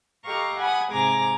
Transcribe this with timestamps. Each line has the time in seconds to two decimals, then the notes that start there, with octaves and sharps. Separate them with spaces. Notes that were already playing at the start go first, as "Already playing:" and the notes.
0.24 G4 A4 D#5 F5 A#5 C#6
0.58 F#5 G#5 B5 D#6
0.92 G#2 C3 G#4 G#5 A#5 D6